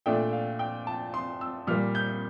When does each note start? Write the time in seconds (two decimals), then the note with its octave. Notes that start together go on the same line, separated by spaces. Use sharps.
0.06 A#2 A3 D4 G5
0.33 F5
0.59 G5
0.87 A5
1.14 C6
1.41 E6
1.67 A#2 G3 A#3 F6
1.95 G6